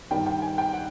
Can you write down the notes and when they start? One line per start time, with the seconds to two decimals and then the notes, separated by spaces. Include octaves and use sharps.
0.11 G2 D#3 G3 G5
0.26 G5
0.42 G#5
0.58 G5
0.73 F#5